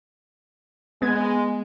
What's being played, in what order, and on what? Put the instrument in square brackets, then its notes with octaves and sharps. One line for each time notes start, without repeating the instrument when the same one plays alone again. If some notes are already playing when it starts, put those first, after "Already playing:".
[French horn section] G#3 [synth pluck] B3 G#6